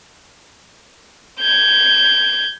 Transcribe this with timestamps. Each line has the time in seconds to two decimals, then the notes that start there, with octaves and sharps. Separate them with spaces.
1.39 G6 G#6